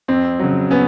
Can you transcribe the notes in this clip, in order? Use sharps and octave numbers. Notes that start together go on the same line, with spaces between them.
F2 C4
C#3 F#3
B3 C#4